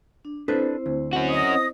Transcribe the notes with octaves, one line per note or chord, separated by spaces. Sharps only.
D4
C4 D4 E4 A4 B4 C5
D2
C#4 F#4
D#5 D#6